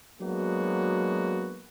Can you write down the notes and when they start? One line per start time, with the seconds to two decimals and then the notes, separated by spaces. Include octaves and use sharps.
0.20 F#3 G#3 A#3 B3 D4 F#4